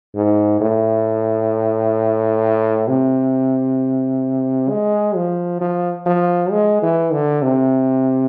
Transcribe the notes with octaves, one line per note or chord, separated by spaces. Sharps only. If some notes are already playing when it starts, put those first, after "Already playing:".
G#2
A2
C3
G#3
F3
F3
F3
G#3
E3
D3
C3